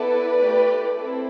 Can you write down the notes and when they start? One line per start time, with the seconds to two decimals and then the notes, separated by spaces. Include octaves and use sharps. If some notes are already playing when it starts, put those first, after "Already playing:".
Already playing: B3 E4 A4 B4 D5
0.39 A3 E4 G4
0.98 C4 E4 A4